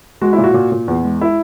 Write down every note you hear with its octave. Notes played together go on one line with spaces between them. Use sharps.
G#3 F#4
E4
A#2
F#4
A#2
A#2
E2
G#3
E4